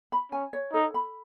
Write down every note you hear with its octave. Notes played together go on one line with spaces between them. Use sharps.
B5
C#4 G#5
C#5
D#4 A4
B5